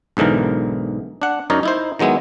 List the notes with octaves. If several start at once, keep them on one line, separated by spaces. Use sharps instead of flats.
B1 G#2 D3 E3 A#4
D4 F#5
F#2 D#4 A#4 C#5 D5 A#5
D#4 E4 C5
D#3 F#3 G#3 B3 E4